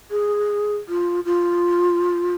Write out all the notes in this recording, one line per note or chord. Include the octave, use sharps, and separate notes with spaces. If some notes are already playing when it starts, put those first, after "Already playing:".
G#4
F4
F4